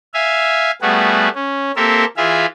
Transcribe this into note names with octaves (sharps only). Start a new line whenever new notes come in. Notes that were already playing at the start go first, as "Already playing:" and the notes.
E5 F5 G#5
G3 A3 B3 F#4 G#4
C#4
A#3 C4 G4 A4 A#4 E5
E3 F4 G#4 E5 F5